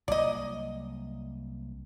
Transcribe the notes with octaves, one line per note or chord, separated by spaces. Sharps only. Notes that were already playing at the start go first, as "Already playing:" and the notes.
C2 F#3 A#3 D5 D#5